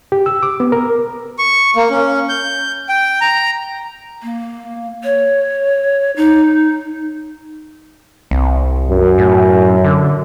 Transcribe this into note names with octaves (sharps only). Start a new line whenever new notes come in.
G4
E6
D6
B3
A#4
C#6
A#3
C#4
G6
G5
A#5
A#3
C#5
D#4
C2
F#2
A2
D3